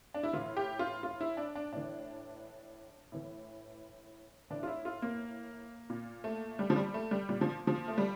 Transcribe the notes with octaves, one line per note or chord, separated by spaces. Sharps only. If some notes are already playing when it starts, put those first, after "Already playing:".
D4
E4
A2 E3 F4
G4
F4
F4
E4
D4
D4
A2 E3 D4
A2 E3
A2 E3 D4
F4
E4
F4
A#3
A#2
A3
G3
F3
G3
A3
G3
A#2 G3
F3
F3
A3
G3